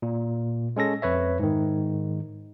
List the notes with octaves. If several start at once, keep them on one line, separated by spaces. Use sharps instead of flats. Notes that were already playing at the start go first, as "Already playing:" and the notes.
A#2
G#3 C#4 A4 A#6
F2 B4 C#5 E5
G#2 D#3